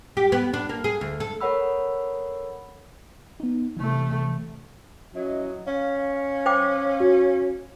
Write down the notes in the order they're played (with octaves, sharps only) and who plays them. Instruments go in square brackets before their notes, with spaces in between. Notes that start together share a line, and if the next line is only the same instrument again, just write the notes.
[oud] G4
B3
D4
A#3
G#4
D2
A4
[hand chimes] A4 A#4 C#5 F#5 B5 E6
[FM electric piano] B3 D#4
[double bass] C3 A3 [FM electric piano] E3
[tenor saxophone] F#3 [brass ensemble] C#4 E4 D#5
[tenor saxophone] C#4 [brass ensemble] F5
[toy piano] C5 G5 D6
[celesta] F#4